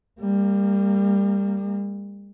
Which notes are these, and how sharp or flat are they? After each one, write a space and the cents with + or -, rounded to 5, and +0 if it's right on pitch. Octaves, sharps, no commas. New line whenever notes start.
G3 +25 A#3 -25